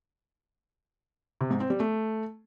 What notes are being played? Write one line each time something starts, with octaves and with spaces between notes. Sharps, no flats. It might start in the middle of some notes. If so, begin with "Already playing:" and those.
C3
G#2
C4
G3
A3